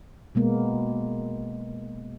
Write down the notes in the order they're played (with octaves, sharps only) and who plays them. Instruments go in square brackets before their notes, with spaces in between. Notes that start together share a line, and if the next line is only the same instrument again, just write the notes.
[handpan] B2 G#3 A#3 B3